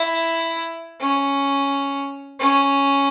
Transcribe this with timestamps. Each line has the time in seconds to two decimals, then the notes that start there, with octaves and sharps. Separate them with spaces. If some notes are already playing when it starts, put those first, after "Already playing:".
Already playing: E4
1.00 C#4
2.39 C#4